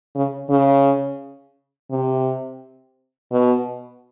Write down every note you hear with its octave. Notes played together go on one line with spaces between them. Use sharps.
C#3
C#3
C3
B2